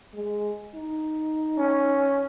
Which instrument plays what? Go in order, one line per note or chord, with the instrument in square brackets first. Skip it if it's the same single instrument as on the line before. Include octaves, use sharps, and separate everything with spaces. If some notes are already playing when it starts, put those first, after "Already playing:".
[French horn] G#3
D#4
[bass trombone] C#4